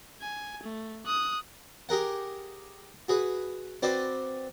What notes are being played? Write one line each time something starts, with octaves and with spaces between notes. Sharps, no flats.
G#5
A3
D#6 F#6
G4 G#4 A#4 F#5
F#4 G#4 B4
C4 F#4 B4 C5 D5